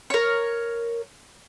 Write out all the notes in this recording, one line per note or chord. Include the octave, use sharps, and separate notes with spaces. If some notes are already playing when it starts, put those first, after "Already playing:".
A#4 C#5